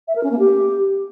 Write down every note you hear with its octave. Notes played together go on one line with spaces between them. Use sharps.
E5
A#4
C#4
A#3
G4